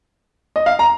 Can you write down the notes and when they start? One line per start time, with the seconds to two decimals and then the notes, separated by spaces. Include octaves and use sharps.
0.56 D#5
0.66 F5
0.79 A#5